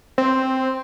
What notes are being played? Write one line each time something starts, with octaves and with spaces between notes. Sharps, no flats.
C4